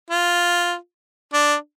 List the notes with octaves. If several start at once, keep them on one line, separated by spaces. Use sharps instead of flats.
F4
D4